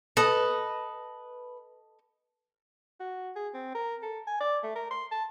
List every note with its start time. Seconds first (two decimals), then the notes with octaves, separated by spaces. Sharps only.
0.17 A4 B4 D#5
3.00 F#4
3.36 G#4
3.54 C4
3.75 A#4
4.02 A4
4.27 G#5
4.40 D5
4.63 A3
4.75 A#4
4.91 C6
5.11 A5